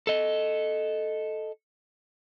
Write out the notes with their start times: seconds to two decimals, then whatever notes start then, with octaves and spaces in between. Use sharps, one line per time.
0.07 A4 D#5